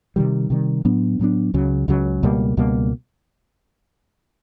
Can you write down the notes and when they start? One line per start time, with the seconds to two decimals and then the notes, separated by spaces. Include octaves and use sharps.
0.16 C3 D#3 G3
0.50 C3 D#3 G3
0.85 A2 F#3 B3 D4
1.19 A2 F#3 B3 D4
1.54 C#2 C#3 F#3
1.88 C#2 C#3 F#3
2.23 C#2 B2 G3 A#3
2.57 C#2 B2 G3 A#3